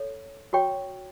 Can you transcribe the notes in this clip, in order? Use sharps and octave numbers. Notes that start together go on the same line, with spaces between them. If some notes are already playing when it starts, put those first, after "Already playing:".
Already playing: A4 C#5
F#4 C#5 G5 C#6